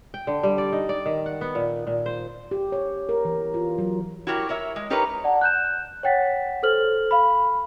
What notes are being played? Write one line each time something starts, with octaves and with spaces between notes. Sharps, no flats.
G5
D3
G3
D5
D#4
D5
D#3
F#5
B3
A#2
A#2
C5
G4
C#5
A#4
E3
F4
F#3
E4 F#4 G4 A#4 C#5
A#4 C#5 E5
G#3
D#4 G4 A#4 B4 C#5
D5 F#5 A5
F#6 G6 E7
C#5 F#5 G5 A6 B6
A4 C5 F6 F#7
F5 B5